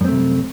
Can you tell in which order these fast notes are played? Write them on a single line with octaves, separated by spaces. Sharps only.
F#2 C4 A3 C3 G3